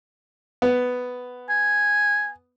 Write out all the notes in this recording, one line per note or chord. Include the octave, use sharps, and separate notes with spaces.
B3
G#5